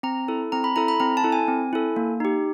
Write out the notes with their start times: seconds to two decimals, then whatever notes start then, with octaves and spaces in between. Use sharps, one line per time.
0.03 C4 A#5
0.28 E4 A4
0.52 C4 A#5
0.64 B5
0.76 E4 A4 A#5
0.88 B5
1.00 C4 A#5
1.17 A5
1.24 E4 A4
1.32 G#5
1.48 C4
1.73 E4 A4
1.96 A#3
2.20 D#4 G4